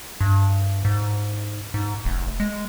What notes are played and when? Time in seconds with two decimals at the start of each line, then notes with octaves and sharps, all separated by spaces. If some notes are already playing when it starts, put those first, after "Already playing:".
0.21 G2
0.85 G#2
1.74 G#2
2.05 F1
2.40 G#3